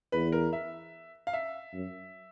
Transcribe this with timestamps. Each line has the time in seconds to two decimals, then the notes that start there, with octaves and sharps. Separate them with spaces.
0.12 E2 B4
0.32 A#4
0.53 E5
1.27 F5
1.33 E5
1.73 F#2